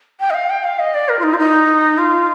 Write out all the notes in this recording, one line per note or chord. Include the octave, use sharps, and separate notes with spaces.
G5
D#5
F5
G5
F5
D#5
D5
A#4
F4
D#4
F4
D#4
F4